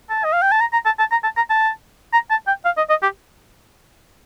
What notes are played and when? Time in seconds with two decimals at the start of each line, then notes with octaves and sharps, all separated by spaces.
0.10 A5
0.24 D#5
0.33 F5
0.42 G5
0.51 A5
0.61 A#5
0.73 A#5
0.86 A5
0.99 A5
1.11 A#5
1.24 A5
1.37 A#5
1.50 A5
2.13 A#5
2.30 A5
2.47 G5
2.65 F5
2.77 D#5
2.90 D#5
3.02 G4